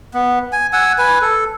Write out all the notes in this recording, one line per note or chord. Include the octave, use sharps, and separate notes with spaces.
B3
G#5
F#5 G#5 E6
B4 G#5
A4